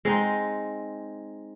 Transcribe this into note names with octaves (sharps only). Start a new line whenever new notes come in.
G#3 C4 D#4